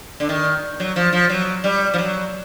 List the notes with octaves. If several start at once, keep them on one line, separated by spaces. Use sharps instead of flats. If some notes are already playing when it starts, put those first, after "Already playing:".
D3
D#3
F#3
F3
F3
F#3
G3
F3
F#3